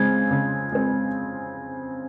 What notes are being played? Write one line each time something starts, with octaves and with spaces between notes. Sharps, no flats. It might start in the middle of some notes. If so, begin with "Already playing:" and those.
Already playing: C#3 G#3 C4 G#6
C#3
G#3 C4